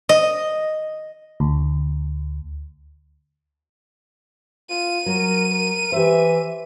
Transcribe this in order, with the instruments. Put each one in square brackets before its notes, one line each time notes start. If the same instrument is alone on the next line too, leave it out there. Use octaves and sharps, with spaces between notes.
[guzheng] D#5
[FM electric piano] D2
[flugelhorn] F4 [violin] D#7
[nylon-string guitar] F#3 [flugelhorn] A#4
[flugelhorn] A#4
[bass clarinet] E3 [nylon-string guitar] G4 C5 [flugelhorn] E5